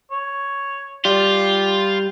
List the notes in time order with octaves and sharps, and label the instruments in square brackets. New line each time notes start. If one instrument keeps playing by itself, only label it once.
[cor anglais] C#5
[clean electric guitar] G3 [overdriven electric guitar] F4 [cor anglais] G4